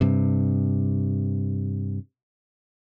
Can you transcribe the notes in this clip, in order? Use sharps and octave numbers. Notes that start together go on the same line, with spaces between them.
G2 C3